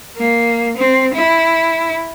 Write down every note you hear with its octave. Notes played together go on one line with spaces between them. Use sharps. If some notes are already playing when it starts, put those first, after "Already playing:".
A#3
C4
E4